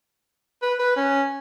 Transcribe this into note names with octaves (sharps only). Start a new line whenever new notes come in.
B4
B4
C#4